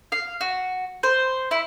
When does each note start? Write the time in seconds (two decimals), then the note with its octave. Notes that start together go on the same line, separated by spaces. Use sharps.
0.12 F5
0.41 F#4
1.03 C5
1.51 E4